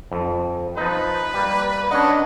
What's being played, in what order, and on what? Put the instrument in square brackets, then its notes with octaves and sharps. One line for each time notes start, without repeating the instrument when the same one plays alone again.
[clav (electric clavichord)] F2
[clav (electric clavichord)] F3 D#4 [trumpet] B4
[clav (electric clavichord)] G3 A#3
[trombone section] C#4 D4 [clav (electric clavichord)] A#4 C#5 [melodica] D#5 F#5